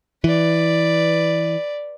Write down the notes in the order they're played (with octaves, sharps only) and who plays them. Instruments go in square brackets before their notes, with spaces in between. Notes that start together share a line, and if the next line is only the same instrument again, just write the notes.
[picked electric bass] E3 [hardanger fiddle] B4 D5